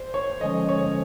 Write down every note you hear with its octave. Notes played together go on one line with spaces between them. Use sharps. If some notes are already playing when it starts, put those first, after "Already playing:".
Already playing: C5
C#5
D3 F3 G#3 C#4 D#5
C#5